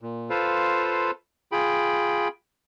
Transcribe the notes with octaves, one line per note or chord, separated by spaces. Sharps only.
A#2
F4 A4 B4 C5 F5
F4 G#4 G5 B5